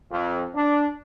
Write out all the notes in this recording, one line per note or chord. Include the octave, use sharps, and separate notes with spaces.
F2
D4